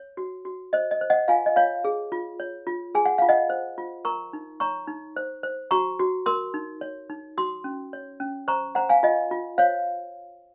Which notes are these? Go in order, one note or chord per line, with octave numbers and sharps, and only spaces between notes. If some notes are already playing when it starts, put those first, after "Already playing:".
Already playing: C#5
F#4
F#4
C5 D#5
D#5
C5
D#5 F#5
F4 F5 G#5
D#5
F4 C#5 F5
G#4
F4
C#5
F4
G#4 G#5
F#5
F4 F5
D#5 F#5
C5
F4
A#4 A#5 C#6
D#4
C#5 A#5 C#6
D#4
C5
C5
F#4 A#5 C#6
F#4
A#4 C6 D#6
D#4
C#5
D#4
F#4 C6 D#6
C#4
C#5
C#4
C5 A#5 C#6
C5 F#5 A#5
F5 G#5
F4 D#5
F4
C5 C#5 F5